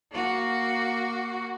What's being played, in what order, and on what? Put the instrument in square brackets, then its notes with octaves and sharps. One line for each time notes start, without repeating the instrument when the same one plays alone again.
[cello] A#3 F#4